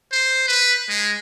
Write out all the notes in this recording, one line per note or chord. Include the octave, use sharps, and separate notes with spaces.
C5
B4
G#3